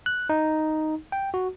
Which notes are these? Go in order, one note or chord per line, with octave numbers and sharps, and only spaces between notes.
F#6
D#4
G5
F#4